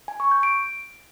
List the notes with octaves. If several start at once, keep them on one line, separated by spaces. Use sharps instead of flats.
G#5
C#6
G6
D7